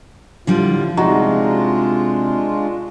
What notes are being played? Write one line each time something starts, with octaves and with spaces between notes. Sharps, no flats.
A2 D3 F3 G3 F4
C3 G#3 D4 D#4 F4 F#4 A#5